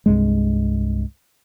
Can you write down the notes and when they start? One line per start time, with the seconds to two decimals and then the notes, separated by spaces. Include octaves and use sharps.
0.06 C2 G2 G#3